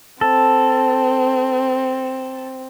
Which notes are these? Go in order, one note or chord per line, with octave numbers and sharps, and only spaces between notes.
C4 A4